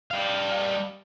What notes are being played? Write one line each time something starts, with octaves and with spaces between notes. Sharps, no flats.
G3 F5